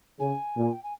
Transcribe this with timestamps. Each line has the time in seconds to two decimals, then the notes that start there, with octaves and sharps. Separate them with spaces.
0.19 C#3 G#5
0.56 A#2
0.73 G5
0.84 G#5